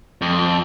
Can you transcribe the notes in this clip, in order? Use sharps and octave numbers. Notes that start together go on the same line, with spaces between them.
F2